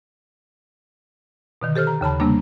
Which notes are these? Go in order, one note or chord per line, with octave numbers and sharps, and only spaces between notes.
B2 D3 D#3
G4 A4 C5 F6
A#5
D#2 C#3 A5 B5
C3 G3 A3 A#3 D4